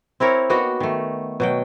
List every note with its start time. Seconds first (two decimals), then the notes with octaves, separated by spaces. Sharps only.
0.20 C4 E4 A#4 C#5
0.50 A#3 B3 D#4 F#4
0.80 D#3 A3
1.40 B2 F#3 G5